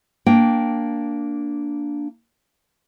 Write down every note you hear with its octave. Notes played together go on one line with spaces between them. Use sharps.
A#3 D4 G5